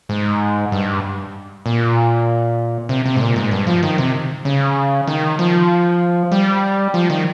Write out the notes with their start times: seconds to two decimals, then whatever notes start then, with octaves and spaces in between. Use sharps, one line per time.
0.09 G#2
0.72 G2
1.66 A#2
2.89 C3
3.06 C3
3.16 G#2
3.21 A#2
3.36 G#2
3.51 G2
3.67 F3
3.83 D#3
3.98 C3
4.45 C#3
5.07 D#3
5.39 F3
6.32 G3
6.94 F3
7.10 D#3